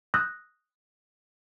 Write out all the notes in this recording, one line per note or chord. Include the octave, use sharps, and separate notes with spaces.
D#6 E6 F#6 G6 A#6